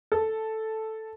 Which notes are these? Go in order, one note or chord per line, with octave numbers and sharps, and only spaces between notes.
A4